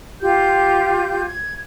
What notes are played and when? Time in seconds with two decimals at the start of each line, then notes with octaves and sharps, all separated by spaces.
0.21 F4 G4 G6
1.27 G#6